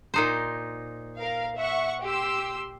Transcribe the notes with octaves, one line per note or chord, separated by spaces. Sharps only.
A#2 D#4 C5
A#4 F5
E5 F#5 C#6
G4 C6 E6